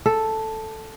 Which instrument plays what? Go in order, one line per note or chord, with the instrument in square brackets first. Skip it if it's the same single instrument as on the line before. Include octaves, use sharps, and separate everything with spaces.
[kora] A4